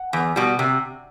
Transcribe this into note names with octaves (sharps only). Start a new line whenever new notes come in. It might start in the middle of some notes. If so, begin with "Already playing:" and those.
Already playing: F#5
E2
B2 G3
C3